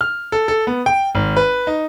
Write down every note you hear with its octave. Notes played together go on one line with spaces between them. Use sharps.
F6
A4
A4
B3
G5
G#1
B4
D#4